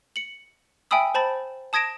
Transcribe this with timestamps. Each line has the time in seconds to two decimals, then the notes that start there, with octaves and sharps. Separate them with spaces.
0.16 C#7 F#7
0.91 E5 G5 G#5 B5 D#6 E6
1.15 C5 A5 B5 A6
1.73 A5 D#6 G#6 A#6 D7 E7